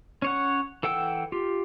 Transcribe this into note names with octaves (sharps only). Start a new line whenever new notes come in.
C#4 C#5 F#5
E3 A4 F#5 G5 E6
F4 G4